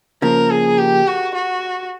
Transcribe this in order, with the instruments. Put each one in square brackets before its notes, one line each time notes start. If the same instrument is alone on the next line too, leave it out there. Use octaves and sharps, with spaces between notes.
[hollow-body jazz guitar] C#3 F3 A#3 [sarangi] A#4
[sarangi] G#4
G4
F#4
F#4